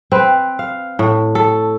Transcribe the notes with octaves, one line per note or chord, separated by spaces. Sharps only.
C4 B4
F5
A2
A4